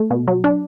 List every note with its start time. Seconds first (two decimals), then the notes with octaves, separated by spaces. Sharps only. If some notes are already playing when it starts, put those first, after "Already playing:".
Already playing: A3
0.11 B2
0.28 F#3
0.44 D4